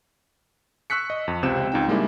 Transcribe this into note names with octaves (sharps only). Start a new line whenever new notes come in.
C#6 E6 F#6 B6 C#7
D#5
F2
C#2 C3 C4 G5 E7
C#2 D#4 G5
G3 G#3 A#3 D4 E4